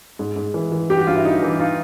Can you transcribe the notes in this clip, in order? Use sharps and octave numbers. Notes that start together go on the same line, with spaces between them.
G#2
G#2
E3
E3
G2 G4
F#4
G2 F4
E4
E3 D#4
E3
D#4 F4